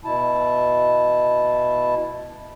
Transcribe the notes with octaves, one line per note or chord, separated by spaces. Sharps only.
B2 E4 A5